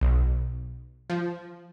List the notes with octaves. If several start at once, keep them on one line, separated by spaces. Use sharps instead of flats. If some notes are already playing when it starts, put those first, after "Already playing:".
B1
F3